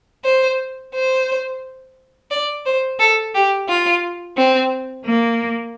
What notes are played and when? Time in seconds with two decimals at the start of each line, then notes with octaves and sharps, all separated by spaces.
0.24 C5
0.94 C5
2.30 D5
2.66 C5
2.99 A4
3.34 G4
3.68 F4
4.37 C4
5.06 A#3